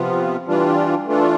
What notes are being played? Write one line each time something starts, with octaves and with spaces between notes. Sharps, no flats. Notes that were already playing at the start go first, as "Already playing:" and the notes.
Already playing: C3 F3 B3 F4
E3 G3 D4 F4
E3 A3 D4 F4